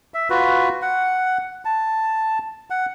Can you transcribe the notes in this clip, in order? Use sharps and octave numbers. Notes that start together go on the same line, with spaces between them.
E5
F4 F#4 B4
F#5
A5
F#5